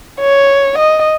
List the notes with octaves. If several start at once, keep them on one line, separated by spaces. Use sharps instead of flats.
C#5
D#5